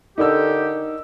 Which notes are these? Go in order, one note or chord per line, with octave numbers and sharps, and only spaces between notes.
D3 D#4 G4 A#4 E6